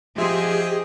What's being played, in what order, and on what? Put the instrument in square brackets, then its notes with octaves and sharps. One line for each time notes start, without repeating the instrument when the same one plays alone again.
[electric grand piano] F3 E5 [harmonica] C4 D#5 C6 [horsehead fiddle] G4 [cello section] G#4